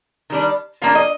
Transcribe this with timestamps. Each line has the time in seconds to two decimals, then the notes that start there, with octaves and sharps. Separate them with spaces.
0.30 D#3 G3 D4
0.82 F3 A#3 D4 F5
0.95 D#5